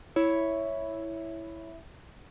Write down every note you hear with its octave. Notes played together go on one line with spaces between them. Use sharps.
E4 C#5